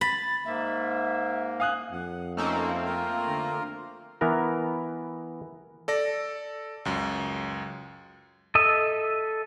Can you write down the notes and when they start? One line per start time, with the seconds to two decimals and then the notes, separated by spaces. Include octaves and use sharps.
0.01 B5 A6
0.45 G#2 A#3 E5
1.60 F5 G#5 D#6 F#6
1.92 F2 F#5
2.37 A3 A#3 C4 C#4 D#4 A4
2.85 F4 A#4
3.27 D3
4.21 E3 B3 A#4 A#5
5.88 A4 D5 A#6
6.85 C#2 F#2
8.55 A4 D#5 E5 D#6